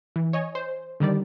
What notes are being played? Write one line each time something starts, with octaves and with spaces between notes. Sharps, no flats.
E3
C#5 D#5 G#5
C5
D3 D#3 G3 D5